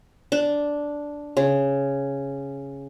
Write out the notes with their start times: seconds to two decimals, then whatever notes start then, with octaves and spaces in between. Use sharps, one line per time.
0.32 D4
1.37 C#3